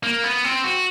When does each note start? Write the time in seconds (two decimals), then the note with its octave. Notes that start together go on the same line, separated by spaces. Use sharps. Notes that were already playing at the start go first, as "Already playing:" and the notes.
0.03 A#3
0.24 B3
0.45 C4
0.64 F#4